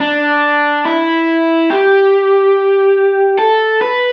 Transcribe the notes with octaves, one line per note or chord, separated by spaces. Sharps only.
D4
E4
G4
A4
B4